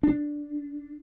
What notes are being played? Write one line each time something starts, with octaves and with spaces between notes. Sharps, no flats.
D4